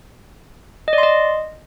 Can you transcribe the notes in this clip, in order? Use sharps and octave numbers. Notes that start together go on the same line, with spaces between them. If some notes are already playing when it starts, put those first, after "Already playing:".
D#5
D5
C6
D#5